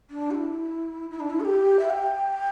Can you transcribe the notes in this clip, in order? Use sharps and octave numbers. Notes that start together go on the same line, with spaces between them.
D4
G4
E4
E4
D4
E4
A4
G4
E5
G5